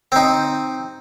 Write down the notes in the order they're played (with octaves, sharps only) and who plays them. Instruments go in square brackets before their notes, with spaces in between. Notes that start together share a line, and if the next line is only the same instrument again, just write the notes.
[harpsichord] C4 D#4